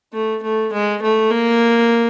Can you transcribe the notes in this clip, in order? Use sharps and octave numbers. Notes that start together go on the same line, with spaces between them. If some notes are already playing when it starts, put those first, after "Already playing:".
A3
A3
G#3
A3
A#3